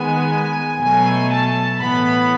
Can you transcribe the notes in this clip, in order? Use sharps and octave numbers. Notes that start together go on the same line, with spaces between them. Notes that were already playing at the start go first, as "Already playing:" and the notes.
Already playing: D#3 G#3 B3 G#5
B2 F#3 A3 G#5
A5
A2 E3 B3 B5